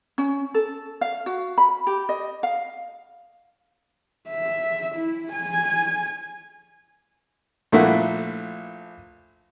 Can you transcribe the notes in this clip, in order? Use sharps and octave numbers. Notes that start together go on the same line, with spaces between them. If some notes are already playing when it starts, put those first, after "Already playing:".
C#4
A4
F5
F#4
B5
G4
D#5
F5
E5
E4
G#5
A#1 A3 A#3 E4 F#5